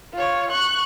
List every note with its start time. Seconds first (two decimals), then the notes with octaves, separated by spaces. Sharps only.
0.14 F4 C#5
0.51 C#6 F#6